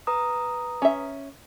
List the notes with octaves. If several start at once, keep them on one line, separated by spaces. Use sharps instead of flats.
B4 A#5 D#6
C#4 E5